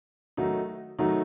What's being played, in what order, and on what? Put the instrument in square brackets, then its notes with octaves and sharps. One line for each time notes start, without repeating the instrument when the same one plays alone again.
[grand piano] D#3 F#3 A3 D#4 F#4
D#3 F#3 A3 D#4 F#4